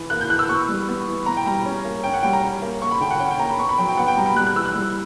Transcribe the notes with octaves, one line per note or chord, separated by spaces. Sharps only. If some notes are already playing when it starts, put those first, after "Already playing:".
Already playing: E3
A#3 F#6
G6
E3 F#6
E6
B3 C#6
G3
B3
E3
B3 A#5
G5
G3 A#5
C#4
A#3
C#4 G5
F#5
G3 G5
A#5
C#4
A#3
A#3 C#6
B5
D3 G5
F#5
C#4 G5
G5
A#3 A#5
B5
B3 C#6
B5
F#3 G5
G5
B3 F#5
G5
G3 A#5
B5
G3 F#6
F#6
E3 E6
F#6
G3